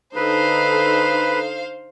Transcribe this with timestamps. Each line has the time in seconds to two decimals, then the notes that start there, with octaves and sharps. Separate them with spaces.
0.16 D3 D#4 A4 B4 C5 F5